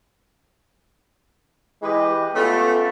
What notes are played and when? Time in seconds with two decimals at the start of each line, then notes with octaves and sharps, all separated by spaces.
1.83 E3 G#3 G4 B4 D#5
2.34 A3 B3 C#4 F4 G4 A4